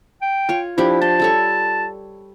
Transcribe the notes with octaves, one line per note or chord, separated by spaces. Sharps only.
G5
F4 C#5
F3 D4 E4 G4
A5 C6
G3 A4 C#5